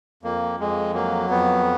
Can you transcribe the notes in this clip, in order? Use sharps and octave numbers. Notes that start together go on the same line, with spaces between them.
F2 A#3
F2 G#3
F#3 A#3
F2 B3